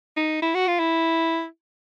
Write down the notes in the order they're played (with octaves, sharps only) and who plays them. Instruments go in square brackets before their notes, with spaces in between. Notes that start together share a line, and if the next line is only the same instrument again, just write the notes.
[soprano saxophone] D#4
E4
F#4
F4
E4